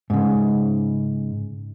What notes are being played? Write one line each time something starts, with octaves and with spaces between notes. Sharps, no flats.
G#2 C#3